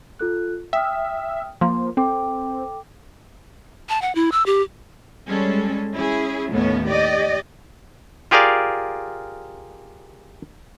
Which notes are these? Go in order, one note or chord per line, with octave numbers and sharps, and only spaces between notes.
F4 A4 F#6
E5 G5 D#6 F6
F3 A#3 C6
C4 A4 G5 D6
A5
F#5
E4
E6
G4
G3 G#3 C#4 A4
C#4 E4 G#4
D#2 A2 A3 B3 C#4
G4 D5 D#5
F4 G4 G#4 A#4 D5 F5